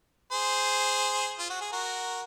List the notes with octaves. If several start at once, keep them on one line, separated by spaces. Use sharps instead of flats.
G#4 C5
F4
F#4
G#4
F#4 A#4